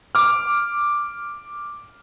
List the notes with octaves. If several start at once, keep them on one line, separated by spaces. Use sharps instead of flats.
D6 F6